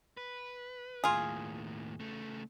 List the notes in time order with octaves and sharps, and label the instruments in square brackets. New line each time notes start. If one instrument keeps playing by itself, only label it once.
[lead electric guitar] B4
[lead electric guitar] D#2 A2 [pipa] F4 G#4
[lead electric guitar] C#3 A3